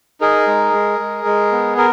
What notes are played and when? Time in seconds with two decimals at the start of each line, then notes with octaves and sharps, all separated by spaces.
0.21 D#4 G#4 A#4
0.47 G#3
0.73 G#3
0.99 G#3
1.25 G#3
1.52 B3
1.78 A#4